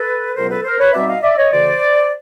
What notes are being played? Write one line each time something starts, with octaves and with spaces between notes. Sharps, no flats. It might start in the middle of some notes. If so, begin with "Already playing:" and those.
Already playing: A4 B4
C#2 B2 F#3 B3 A#4 C5
A4 B4
A#4 C5
B4 C#5
B2 G3 C4 D#4 D5 E5
D#5 F5
D5 E5
C#5 D#5
D2 C#3 E3 C5 D5